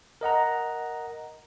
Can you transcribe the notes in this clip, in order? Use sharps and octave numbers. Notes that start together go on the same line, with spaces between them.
A#4 D#5 F#5 A#5